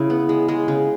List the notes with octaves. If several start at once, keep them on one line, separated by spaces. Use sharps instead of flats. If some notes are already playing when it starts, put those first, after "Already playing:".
Already playing: C#3 E4
B3
G#3
G#3
C#3